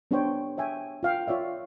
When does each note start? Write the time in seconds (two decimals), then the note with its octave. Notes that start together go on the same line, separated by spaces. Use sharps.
0.11 B3 D4 G4 C5 C#5 G5
0.58 C#5 E5 G5 G#5
1.03 F4 F5 G5
1.28 F4 C#5 D5 E5